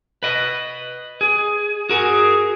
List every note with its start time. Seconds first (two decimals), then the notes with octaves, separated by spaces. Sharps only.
0.23 B4 D#5
1.21 G#4
1.90 F#4 G#4 A#4